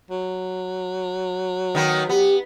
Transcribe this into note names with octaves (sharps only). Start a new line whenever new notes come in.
F#3
D#3 B3
B3 G4